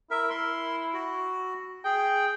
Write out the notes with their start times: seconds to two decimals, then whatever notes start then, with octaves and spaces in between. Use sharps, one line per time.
0.11 E4 A#4 E5
0.30 C6
0.94 F#4
1.85 G#4 G5